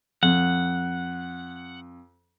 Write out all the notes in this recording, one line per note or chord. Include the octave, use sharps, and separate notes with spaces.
F2 F#5